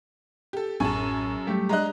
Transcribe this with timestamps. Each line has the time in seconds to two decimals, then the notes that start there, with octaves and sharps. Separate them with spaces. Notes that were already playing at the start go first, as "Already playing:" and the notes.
0.53 G4 A4
0.80 A1 F#2 A2 G#4 G#5 A5 C#6
1.47 F#3 G3 A3 G4
1.69 G#3 D4 D#5 A#5 F#6